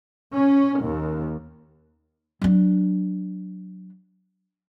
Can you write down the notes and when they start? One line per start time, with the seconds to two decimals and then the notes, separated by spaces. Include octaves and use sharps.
0.34 C#4
0.81 D#2
2.42 F#3 D4